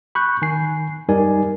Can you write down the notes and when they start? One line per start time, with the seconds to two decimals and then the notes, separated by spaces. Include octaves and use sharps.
0.15 B5 C#6 F#6 G6
0.42 D#3 G#5 C7
1.08 F#2 G3 D#4 A#4 D5 G#5